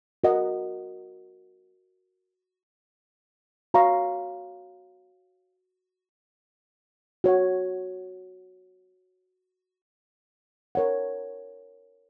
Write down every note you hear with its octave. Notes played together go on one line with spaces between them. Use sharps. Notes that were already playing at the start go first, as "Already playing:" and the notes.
F#4 A#4 D#5 F#5
F#4 C#5 F5 A#5 C#6
F#4 C#5 F#5
A#4 C#5 F#5